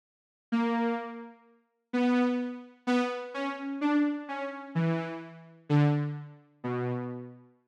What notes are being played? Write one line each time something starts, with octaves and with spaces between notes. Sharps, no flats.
A#3
B3
B3
C#4
D4
C#4
E3
D3
B2